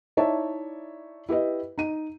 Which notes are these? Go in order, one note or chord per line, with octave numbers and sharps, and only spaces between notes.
D#4 E4 C#5 D5 E5 A5
E4 G4 B4 D#5
D#4 D#7